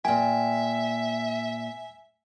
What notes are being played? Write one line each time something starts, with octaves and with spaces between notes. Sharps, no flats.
A#2 E5 G5 G#5